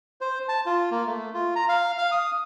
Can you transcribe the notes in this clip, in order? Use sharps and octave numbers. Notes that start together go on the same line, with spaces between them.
C5
A5
F4
A#3
A3
F4
A#5
F5
F5
D#6